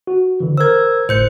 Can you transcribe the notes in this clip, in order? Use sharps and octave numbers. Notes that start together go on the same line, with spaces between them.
F#4
D3 E3
A#4 C5 E6 G#6
G1 A2 C5 G6 C#7